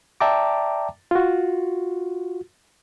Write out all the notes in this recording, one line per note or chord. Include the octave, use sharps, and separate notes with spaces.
D5 E5 G5 A5 A#5 D6
F4 F#4